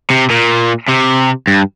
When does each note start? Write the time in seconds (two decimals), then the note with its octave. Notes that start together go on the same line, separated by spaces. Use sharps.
0.10 C3
0.30 A#2
0.89 C3
1.47 G2